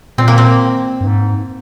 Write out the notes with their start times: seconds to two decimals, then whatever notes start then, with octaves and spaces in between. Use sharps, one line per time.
0.18 A#2 C4
0.28 A#3
0.38 C4
1.01 G2
1.07 G#2